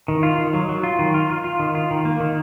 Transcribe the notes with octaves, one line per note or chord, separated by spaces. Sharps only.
D#3
F4
D#3
F#3
F#3
F4
D#3
F4
F4
F4
D#3
F4
D#3
A#3
D#3